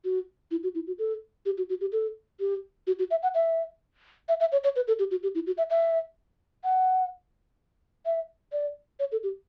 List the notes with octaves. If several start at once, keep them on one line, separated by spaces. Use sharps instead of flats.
F#4
E4
F#4
E4
F#4
A4
G4
F#4
F#4
G4
A4
G4
F#4
F#4
E5
F#5
E5
E5
E5
C#5
C#5
B4
A4
G4
F#4
G4
E4
F#4
E5
E5
F#5
E5
D5
C#5
A4
G4